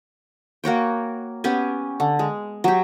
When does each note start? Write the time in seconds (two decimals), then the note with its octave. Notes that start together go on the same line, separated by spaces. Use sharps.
0.64 A#3 F#4 C#5 G5
1.44 B3 C#4 G4 G#5
2.00 D3
2.19 G#3
2.64 F#3 G4